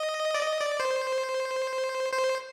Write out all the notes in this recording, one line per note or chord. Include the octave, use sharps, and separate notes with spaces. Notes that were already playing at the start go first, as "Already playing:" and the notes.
Already playing: D#5
D5
D#5
D5
C5
C5